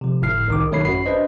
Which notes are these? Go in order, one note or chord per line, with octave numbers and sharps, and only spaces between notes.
C3 F3
G1 A2 F6 C7
C2 D#3 D6
B1 D#3 A3 C#5 B5 C7
G#1 F#2 F#4 B5 C7
D4 B4 C5 D#5